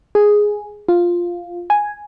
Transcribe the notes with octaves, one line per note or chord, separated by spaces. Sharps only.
G#4
F4
G#5